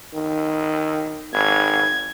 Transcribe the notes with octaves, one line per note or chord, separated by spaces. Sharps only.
D#3
G#1 G#6